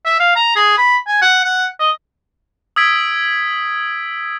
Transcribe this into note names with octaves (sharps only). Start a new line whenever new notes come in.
E5
F5
A#5
G#4
B5
G#5
F#5
F#5
D#5
D#6 E6 G#6 B6 D7